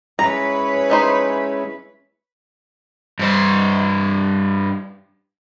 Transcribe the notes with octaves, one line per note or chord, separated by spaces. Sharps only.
G#3 C#4 E4 B4 C#5 A#5
A3 D#4 C5
G2 C5